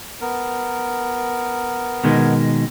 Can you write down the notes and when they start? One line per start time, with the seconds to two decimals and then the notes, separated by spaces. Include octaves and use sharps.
0.21 B3 A#4
2.04 B2 D#3 G#3